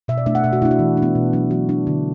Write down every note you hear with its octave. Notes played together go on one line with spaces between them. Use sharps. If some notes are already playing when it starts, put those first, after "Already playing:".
B2 E5
D5
A3 D4 E5
F#5
B2 E5
F#4
A3 D4 E4
F#4
E3
D4
B3
B2
F#3 D4
E3 F#4
D4
D3